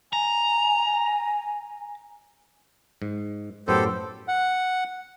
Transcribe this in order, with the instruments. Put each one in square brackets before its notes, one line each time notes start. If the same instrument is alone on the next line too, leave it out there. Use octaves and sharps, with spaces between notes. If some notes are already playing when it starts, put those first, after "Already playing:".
[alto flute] G#5 [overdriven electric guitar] A#5
[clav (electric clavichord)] G#2
[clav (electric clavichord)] F#2 A2 B3 [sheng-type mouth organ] G4 A4 C5
[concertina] F#5